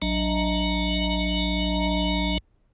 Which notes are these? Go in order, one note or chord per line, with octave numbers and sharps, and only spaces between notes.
A1 F#3 D4 D#5 A#5